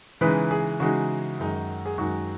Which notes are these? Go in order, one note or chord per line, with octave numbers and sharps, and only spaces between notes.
C#3 E3 G#3 D#4 B4
G#4
C#3 E3 G#3 D#4 F#4
F#2 D#3 G#3 D#4
G#4
F#2 D#3 G#3 D#4 F#4